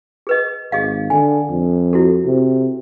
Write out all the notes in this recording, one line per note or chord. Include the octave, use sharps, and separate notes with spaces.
G#4 B4 D#5
G#1 G#4 D#5 F5
D3 G#5
F2
E4 F#4 A4
C3